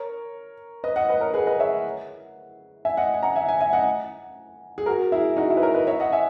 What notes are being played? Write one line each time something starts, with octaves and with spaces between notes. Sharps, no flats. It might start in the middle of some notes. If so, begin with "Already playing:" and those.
Already playing: A#4 C#5
B4 D#5
D#5 F#5
B4 D#5
A#4 C#5
G#4 B4
B4 D#5
C#5 E5
E5 G#5
D#5 F#5
G#5
F#5 A#5
E5 G#5
E5 G#5
E5 G#5
D#5 F#5
G#4
F#4 A#4
E4 G#4
D#4 F#4
E4
B4
A#4 C#5
B4 D#5
C#5 E5
D#5 F#5
E5 G#5